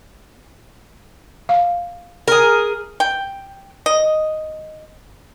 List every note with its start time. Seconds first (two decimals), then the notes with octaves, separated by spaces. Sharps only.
1.49 F5
2.28 G#4 A#4
3.00 G5
3.86 D#5